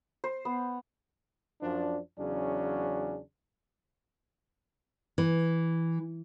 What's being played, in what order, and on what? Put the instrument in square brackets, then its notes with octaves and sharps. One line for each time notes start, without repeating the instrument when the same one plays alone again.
[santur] C5
B3
[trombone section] F#2 F3 D4
E2 C#3 F#3 C#4 D4
[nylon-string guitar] E3